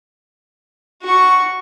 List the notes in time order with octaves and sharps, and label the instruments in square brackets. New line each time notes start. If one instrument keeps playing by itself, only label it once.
[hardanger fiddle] F#4 C#6